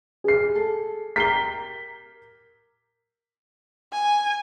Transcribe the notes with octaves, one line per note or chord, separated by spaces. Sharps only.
G#4 C7
A4
G4 A#4 A#5 B6 C7 G7
G#5